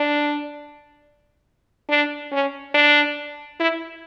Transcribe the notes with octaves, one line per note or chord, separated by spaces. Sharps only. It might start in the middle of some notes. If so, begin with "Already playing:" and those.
Already playing: D4
D4
C#4
D4
E4